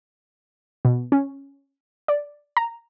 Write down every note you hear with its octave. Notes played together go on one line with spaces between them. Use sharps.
B2
C#4
D5
A#5